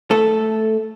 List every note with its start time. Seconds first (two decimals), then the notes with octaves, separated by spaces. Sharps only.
0.11 A3 A4